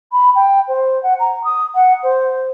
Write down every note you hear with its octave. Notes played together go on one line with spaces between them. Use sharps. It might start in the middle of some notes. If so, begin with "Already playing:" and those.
B5
G5
C5
F#5
A#5
D#6
F#5
C5